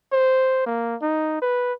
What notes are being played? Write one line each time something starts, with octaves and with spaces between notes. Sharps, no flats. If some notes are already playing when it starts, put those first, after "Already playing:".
C5
A#3
D#4
B4